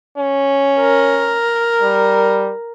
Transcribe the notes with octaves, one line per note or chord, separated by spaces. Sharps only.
C#4
A#4
G3